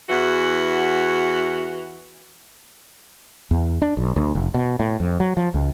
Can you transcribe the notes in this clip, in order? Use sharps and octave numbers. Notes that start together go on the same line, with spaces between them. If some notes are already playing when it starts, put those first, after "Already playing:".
E2 E3 F#4
E2
D4
B1
D2
F1
B2
A2
F2
F#3
F3
C#2